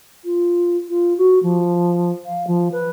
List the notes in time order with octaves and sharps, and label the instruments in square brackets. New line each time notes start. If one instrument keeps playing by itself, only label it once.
[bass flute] F4
F4
F#4
F3
F5
F3
B4